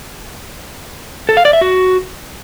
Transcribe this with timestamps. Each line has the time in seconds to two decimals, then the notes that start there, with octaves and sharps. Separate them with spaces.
1.29 A4
1.37 F5
1.45 D5
1.53 E5
1.61 F#4